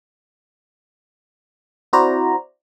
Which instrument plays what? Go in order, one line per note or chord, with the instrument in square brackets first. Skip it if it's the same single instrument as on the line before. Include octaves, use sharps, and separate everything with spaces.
[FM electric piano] C4 E4 F#4 C5 D5 A#5